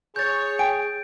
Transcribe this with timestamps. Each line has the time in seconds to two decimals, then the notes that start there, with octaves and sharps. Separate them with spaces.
0.16 G#4 C#5 G6 A6
0.59 G5 G#5 D7